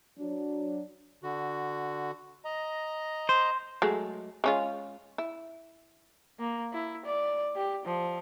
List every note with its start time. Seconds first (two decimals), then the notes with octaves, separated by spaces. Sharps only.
0.18 F#3 D4
1.23 D3 F#4
2.45 D#5 A#5
3.29 C5
3.82 F#3 G#3 A3
4.44 G#3 C#4 F4
5.18 E4
6.39 A#3
6.73 E4
7.05 D5
7.55 G4
7.85 F3